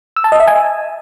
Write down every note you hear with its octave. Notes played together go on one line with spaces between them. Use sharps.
E6
A5
D#5
E5
G#5